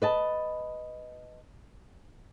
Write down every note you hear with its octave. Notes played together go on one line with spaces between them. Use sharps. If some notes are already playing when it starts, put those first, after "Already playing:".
B4 D#5 A5